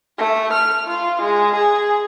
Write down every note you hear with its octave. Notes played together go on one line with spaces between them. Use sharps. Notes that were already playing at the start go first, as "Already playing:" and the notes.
A3
F6
F4
G#3
G#4